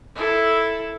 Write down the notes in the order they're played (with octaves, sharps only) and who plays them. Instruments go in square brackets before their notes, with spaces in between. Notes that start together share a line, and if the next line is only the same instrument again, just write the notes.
[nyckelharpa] E4 A4